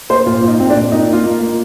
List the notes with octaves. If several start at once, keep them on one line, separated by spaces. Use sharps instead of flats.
A#3 C5
A#2 F4
A#2
D#4
A#2 C4
D4
A#2
A#3 D#4
A#3
F4
A#3
A#3